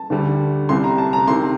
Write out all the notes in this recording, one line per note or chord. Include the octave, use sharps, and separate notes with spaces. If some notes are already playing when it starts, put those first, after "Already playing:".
Already playing: A5
D2 D3 G3
C2 C3 G3 C6
A#5
A5
A#5
C2 C3 D#3 C6